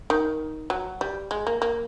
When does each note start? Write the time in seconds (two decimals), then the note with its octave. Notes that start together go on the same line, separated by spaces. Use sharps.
0.10 D#3
0.70 F#3
1.01 G3
1.31 G#3
1.47 A#3
1.62 A#3